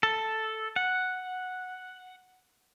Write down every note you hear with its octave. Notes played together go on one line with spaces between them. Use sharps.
A4
F#5